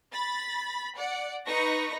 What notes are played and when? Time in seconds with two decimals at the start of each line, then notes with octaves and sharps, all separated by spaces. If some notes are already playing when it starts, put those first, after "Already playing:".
0.13 B5 A6
0.96 D5 F#5
1.47 D#4 B4 C#6 A#6